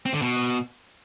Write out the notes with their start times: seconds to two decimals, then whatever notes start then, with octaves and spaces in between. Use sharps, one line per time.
0.06 C4
0.14 D3
0.22 B2